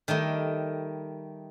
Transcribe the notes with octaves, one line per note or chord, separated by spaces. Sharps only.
D#3 G3 A3 D#4